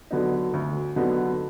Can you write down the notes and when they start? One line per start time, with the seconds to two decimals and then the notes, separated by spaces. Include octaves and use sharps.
0.11 D3 F#3 B3 D#4
0.54 D2
0.96 D3 F#3 B3 D#4